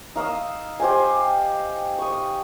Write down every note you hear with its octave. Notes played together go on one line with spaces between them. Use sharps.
D#4 F5 D#6 E6
G4 C5 D#5 G#5
C#6 D#6